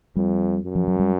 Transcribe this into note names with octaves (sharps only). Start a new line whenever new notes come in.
F2 G3
F#2
F3
F#3
G3